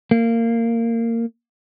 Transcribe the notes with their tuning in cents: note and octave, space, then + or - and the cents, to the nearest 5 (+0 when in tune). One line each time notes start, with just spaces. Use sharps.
A#3 -20